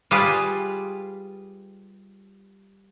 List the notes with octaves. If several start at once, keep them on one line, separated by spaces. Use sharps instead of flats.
G3 F4 G#4 B4 D5